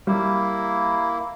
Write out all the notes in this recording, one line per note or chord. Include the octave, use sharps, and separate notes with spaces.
G3 A#3 E4